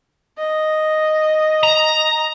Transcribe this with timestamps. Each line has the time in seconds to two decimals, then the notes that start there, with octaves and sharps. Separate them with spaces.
0.38 D#5
1.63 A#5